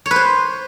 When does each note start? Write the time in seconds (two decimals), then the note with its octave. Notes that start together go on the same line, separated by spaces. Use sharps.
0.06 C#5
0.11 B4
0.16 C5